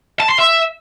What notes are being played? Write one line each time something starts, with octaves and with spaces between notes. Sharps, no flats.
A5
C6
E5